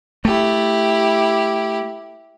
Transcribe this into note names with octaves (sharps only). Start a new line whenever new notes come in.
A3 E4 G4